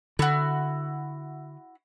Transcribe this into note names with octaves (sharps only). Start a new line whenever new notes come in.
D3 E4 F#4